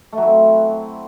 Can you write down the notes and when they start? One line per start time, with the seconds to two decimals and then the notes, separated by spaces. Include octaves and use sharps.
0.13 A3
0.17 F#3
0.22 E4
0.27 C4